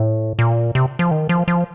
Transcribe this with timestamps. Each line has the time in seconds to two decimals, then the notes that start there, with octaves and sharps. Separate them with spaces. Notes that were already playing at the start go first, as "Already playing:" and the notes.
Already playing: A2
0.39 A#2
0.75 C3
0.99 F3
1.11 D#3
1.29 F3
1.48 F3